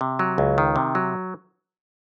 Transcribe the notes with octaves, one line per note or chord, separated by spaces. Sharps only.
C3
F#3
C#2
D#3
C3
F#3